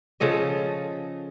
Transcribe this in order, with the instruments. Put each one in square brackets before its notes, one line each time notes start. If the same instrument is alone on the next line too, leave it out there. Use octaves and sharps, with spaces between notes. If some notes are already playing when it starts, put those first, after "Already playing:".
[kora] C#3 F3 A4 D#5